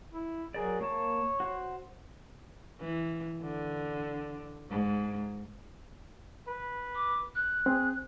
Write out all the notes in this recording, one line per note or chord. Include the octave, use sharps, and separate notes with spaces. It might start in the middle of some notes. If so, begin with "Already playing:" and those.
E4
F#3 G#4 A#4 D5
A#3 C#5 A5
F#4 C5
E3
D3
G#2
B4
D6
F#6
C4 G#4